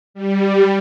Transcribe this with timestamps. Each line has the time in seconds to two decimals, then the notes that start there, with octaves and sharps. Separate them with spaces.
0.14 G3